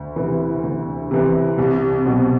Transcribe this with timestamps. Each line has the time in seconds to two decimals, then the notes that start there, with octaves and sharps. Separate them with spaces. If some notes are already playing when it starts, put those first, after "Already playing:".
Already playing: D2
0.16 C3 E3
0.63 D2
1.11 C3 E3
1.58 C2
2.05 B2 F#3 C4 F#4